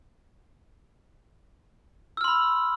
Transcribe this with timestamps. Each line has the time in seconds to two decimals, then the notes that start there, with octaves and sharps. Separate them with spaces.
2.17 E6
2.21 F6
2.24 C6
2.28 B5